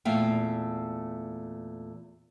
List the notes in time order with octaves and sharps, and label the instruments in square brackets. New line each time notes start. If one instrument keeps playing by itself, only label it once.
[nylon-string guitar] E2 A#2 A3 E5 F5 G5